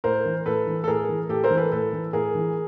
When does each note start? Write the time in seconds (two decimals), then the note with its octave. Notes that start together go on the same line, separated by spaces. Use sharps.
0.04 A2 A#4 C5
0.26 E3
0.46 A2 A4 B4
0.67 E3
0.84 A4
0.88 A2 G#4 A#4
1.09 E3
1.29 A2 G4 A4
1.44 A#4 C5
1.51 E3
1.57 A4 B4
1.72 A2 A4 B4
1.93 E3
2.13 A2 G#4 A#4
2.35 E3